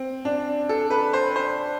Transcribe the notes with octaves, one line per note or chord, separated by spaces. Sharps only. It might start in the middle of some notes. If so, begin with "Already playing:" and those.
Already playing: C4
D4
A4
B4
C5
C5